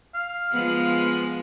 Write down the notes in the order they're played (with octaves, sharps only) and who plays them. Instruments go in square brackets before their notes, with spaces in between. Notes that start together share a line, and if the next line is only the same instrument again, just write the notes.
[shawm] F5
[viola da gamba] F3 G#3 B3